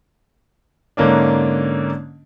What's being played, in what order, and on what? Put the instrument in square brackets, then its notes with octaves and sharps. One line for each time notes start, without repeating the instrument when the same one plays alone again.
[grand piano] G#2 D3 A#3 C#4 D4